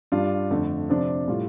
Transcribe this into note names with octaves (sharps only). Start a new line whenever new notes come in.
G2 G3 D4 F4
F2 D3 A3
C3 F3 D4
A2 G3 F4